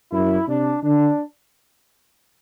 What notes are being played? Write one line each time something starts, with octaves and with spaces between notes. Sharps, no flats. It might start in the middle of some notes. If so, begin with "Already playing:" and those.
F#2 E4
C3 D4
D3 D4